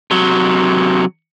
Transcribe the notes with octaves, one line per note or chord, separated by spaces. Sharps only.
C3 F#3